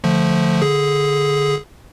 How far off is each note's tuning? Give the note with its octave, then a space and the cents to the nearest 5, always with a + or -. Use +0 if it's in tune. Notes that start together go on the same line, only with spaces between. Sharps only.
D3 +0 F3 +0 A3 +0
D3 +0 G#4 +5